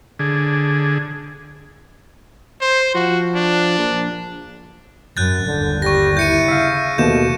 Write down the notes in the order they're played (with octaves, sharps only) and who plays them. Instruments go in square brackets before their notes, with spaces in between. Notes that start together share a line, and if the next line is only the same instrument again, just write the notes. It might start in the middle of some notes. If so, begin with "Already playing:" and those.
[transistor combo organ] D3 G#4
[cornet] C5
[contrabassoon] F3 [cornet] F#4
[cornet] D4
[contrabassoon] A#1
[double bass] F#2 [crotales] F#6 G6 A6
[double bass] G1 D#2 [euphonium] D3
[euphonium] G3 [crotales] C#6 A#6
[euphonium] E4 [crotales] G6 C#7 D#7
[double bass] C#3 [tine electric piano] E5 F5
[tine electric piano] D#2 B2 A#3 [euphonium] A3 [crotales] G6 E7